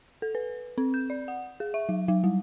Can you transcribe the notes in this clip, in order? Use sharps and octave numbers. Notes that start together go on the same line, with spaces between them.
A4
B4
C4
G6
D5
F#5
G#4
E5
F#3
F#3
G3